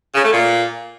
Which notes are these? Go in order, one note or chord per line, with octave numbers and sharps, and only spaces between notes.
C#3
A3
A#2